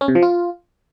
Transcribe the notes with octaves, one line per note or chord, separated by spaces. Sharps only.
C#4
C3
F3
F4